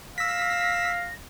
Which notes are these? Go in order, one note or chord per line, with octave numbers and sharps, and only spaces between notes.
F5 E6 A#6 B6